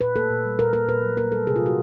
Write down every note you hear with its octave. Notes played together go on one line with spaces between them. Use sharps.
A#2 B4
A#3 A4
A#2
G3
A#2 A#4
A#3 A#4
A#2 B4
F#3
A#3 A#4
G3 A4
C3 G#4
F4
E3 F#4